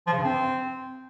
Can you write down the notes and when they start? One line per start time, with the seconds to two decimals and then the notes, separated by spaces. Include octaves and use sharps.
0.07 F3
0.12 C#3
0.18 G2
0.24 C4